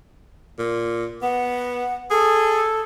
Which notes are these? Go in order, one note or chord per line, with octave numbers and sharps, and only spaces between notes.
A#2
B3 F#5
G#4 A4